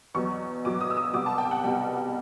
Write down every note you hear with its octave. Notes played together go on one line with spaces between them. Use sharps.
E2 B2 F#3 C#6
E2 B2 F#3 D6
D#6
E6
D#6
C2 B2 G3 D6
A5
G5
F#5
C2 B2 G3 G5